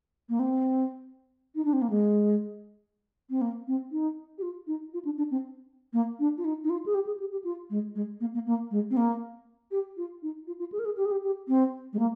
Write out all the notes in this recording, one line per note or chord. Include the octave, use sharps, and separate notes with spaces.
A#3
C4
D#4
D4
C4
A#3
G#3
C4
A#3
C4
D#4
G4
F4
D#4
F4
D4
D4
C4
A#3
D4
F4
D#4
D#4
F4
G#4
G4
G#4
G4
G4
F4
G#3
G#3
A#3
A#3
A#3
G#3
C4
A#3
G4
F4
D#4
F4
F4
G#4
A#4
G#4
G4
G#4
G4
G4
C4
G#3
A#3